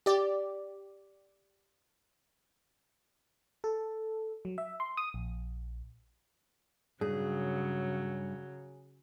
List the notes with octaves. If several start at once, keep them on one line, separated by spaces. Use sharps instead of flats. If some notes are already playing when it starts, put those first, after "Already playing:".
G4 D5
A4
F#3
E5
C6
D#6
A#1
G2 C#3 F#3 G#4